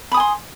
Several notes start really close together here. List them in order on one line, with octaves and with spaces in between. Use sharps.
B5 D#6 G#5 C6